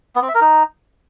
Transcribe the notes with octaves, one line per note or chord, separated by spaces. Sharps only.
B3
C4
E5
A#4
D#4